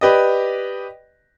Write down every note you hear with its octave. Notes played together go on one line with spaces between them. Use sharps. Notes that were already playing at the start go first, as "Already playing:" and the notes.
G4 B4 D5 D#5